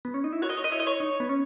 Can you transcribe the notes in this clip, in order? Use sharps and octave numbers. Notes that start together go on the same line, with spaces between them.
B3
C#4
D#4
E4
F#4 C#5
D#5
C#5
D#5
E4 C#5
D#5
C#5
D#4
B3
C#4